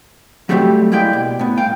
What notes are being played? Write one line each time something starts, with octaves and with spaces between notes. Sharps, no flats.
F#3 G3 A3 C4 D4 G4
G#3 A#3 E4 D5 G5
B2
A2 B3
C2 F5 G5